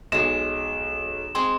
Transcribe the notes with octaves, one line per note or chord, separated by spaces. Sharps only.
B1 G#3 G#4 E7
G#3 C4 G#4 C6